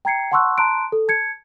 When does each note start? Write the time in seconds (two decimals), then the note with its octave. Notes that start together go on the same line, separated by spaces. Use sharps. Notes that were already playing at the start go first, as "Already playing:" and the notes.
0.05 G5 A#5 G#6 C7 C#7
0.31 F#5 A5 C6 C#6 E6 F#6
0.58 A5 A#5 C6 F#6 D7
0.92 A4
1.08 A5 G#6 C#7